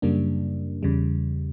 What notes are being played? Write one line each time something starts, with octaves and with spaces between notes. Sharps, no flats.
F#2 C#3 G3 A#3 D4
E2 C#3 G3